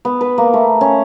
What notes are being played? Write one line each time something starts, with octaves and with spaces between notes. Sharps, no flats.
B3
B4
A#3
A3
C#4